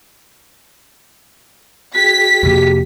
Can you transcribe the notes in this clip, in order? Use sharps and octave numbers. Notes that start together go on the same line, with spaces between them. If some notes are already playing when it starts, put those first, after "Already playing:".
F#4 G#4 G5 B6
F2 C3 A#3 G4